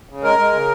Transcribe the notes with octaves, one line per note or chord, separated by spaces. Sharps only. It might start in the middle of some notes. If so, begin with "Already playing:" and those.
C#3
G#3 A#4
G#3
C#3